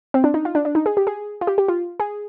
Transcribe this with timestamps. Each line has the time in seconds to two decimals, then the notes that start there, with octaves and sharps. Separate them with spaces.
0.14 C4
0.24 D4
0.34 D#4
0.45 F4
0.55 D4
0.65 D4
0.75 D#4
0.86 G#4
0.97 G4
1.07 G#4
1.41 F4
1.47 G4
1.58 G4
1.68 F4
2.00 G#4